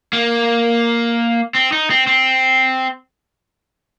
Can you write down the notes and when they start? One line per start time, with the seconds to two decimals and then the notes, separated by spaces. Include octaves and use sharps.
0.13 A#3
1.55 C4
1.72 D#4
1.90 C4
2.07 C4